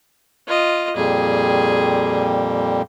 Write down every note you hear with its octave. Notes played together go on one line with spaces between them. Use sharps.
F4 D#5
F2 A#2 G3 G#4